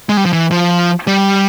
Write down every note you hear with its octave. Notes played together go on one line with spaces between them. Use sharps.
G#3
G3
F3
E3
F3
G3